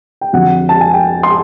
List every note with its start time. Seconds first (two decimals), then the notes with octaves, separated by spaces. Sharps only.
0.21 G5
0.33 F2 D3 F#3 F#5
0.69 A5
0.81 G#5
0.93 G5
1.23 C6